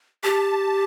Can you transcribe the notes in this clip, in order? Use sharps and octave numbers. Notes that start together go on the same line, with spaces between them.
G4 A5